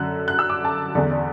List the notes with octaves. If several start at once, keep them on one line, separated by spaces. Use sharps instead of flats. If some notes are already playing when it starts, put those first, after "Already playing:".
Already playing: F#2 D3 F#6
F#6
E6
D6
A5
E2 D3 D5
D5